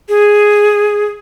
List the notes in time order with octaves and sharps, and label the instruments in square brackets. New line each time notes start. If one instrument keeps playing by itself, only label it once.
[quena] G#4